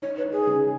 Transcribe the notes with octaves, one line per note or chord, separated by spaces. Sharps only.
D#4 C#5
B4
D#4
G#4
C#3